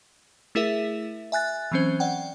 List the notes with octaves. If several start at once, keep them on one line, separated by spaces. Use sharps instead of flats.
A3 E4 G#4 A#4 E5
E5 G#5 F#6 A6
E3 F#3 C4 C#4 C5
D5 F#5 G5